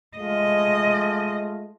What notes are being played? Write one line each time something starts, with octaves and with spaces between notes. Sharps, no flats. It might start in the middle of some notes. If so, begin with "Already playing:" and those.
G#3 A3 F4 D#5